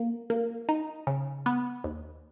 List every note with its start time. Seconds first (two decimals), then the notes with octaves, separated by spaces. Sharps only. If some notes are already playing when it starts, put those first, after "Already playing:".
Already playing: A#3
0.30 A#3
0.69 D#4
1.07 C#3
1.46 B3
1.84 D#2